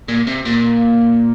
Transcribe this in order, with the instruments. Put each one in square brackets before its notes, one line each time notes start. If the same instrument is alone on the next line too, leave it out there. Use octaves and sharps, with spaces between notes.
[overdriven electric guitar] A#2
C3
A#2